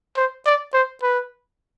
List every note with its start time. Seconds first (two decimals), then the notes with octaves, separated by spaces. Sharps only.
0.17 C5
0.46 D5
0.74 C5
1.02 B4